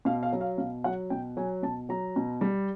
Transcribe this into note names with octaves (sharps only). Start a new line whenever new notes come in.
B2 F5
F5
F#3
F5
B2 F5
F#3 F#5
B2 G5
F#3 G#5
B2 A5
F#3 A#5
B2
G3